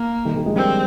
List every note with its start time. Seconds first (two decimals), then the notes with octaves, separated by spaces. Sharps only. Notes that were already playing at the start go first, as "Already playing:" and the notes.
Already playing: A#3
0.25 D#3 G3
0.36 D#3 G3
0.46 F3 G#3
0.56 G3 A#3 C4